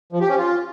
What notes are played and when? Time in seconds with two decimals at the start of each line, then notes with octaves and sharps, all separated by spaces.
0.12 F3
0.21 G4
0.29 C#4
0.38 F4